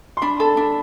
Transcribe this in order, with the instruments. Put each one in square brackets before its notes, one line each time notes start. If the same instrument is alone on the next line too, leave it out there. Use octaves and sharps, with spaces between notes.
[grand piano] C6
[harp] D4 [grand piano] B5
[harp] A4 [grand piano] A5
[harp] D4 [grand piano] B5